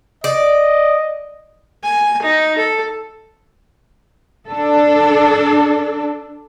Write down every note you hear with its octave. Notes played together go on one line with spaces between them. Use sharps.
D5 D#5
G#5
D#4
A4
D4 A4